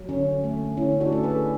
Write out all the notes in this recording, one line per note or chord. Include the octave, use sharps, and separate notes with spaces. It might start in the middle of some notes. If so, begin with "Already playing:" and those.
Already playing: F#3
D3 C#4
A3
D3 C#4 E4
D4 F#4
A3 A4
G#4 B4